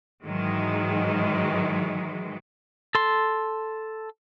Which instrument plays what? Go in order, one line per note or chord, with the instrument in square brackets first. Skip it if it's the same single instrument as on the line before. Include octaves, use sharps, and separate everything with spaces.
[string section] G#2 D#3 E3 F#3 G#3
[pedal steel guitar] A4 C6